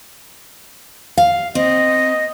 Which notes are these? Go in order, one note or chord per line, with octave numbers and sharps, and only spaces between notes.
F5
C4 D#5